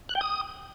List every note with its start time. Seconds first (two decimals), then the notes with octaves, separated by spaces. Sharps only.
0.09 F#6
0.15 G5
0.21 D#6